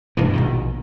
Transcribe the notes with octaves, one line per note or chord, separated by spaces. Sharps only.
G2 B2 E3
A#1 B2 D#3